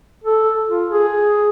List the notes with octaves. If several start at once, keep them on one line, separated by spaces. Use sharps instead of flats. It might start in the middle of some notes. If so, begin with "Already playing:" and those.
A4
F4
G#4